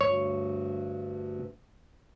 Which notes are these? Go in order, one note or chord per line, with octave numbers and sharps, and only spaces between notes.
D2 G2 C#5